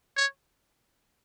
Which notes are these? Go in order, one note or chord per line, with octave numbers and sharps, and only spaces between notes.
C#5